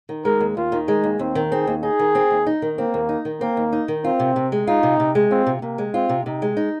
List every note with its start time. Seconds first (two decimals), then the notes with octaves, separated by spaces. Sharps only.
0.09 D#3
0.25 G#3 A#4
0.40 D#2
0.57 D#2 F4
0.72 D#3
0.88 G#3 D#4
1.04 D#2
1.19 D#2 C4
1.35 D#3
1.51 C4 G#4
1.67 D#2
1.83 D#4 G#4
1.99 D#3
2.15 C4
2.31 D#2
2.47 D#4
2.62 D#3
2.78 A#3 C4
2.94 D#2
3.09 D#4
3.25 D#3
3.41 A#3 C4
3.57 D#2
3.73 D#4
3.88 D#3
4.04 C4 F4
4.19 C3
4.36 C3
4.52 G#3
4.67 D#4 F4
4.83 C3
5.00 C3
5.15 G#3
5.31 C4 F4
5.47 C3
5.62 C3 A#3
5.78 G#3
5.94 C4 F4
6.09 C3
6.25 C3 D#4
6.42 G#3
6.57 D#4